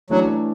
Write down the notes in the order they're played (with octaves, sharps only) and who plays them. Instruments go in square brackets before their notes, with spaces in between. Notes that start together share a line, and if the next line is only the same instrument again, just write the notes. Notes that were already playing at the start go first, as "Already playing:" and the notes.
[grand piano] E3 A3 D4 [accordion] F#3